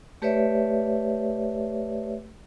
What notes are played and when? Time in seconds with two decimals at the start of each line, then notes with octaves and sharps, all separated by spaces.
0.22 A3 G4 B4 C#5 D5 E5